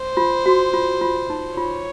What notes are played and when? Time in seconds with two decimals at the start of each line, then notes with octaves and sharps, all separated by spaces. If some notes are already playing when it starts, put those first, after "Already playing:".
Already playing: C5
0.17 F4
0.46 F#4
0.73 F4
1.01 F4
1.30 D#4
1.57 F4 C#5